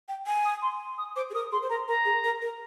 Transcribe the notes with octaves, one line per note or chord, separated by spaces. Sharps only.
G5
G#5
D#6
C6
D#6
C5 D6
G#4
A#4 D#6
G#4 C6
C5
A#4 A#5
A#4 A#5
G#4
A#4
A#4